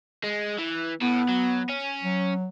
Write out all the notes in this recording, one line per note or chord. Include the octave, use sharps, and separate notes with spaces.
G#3
E3
A2 B3
F#3
C#4
F#3